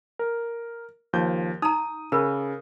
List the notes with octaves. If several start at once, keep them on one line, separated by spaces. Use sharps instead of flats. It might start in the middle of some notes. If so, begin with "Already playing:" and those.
A#4
D#2 F3 G6
D#4 A#5 D#6
C#3 A#4 B5